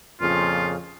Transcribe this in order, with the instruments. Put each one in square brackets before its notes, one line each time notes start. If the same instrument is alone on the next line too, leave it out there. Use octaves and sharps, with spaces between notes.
[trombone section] F2 A#2 C#3 [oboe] F4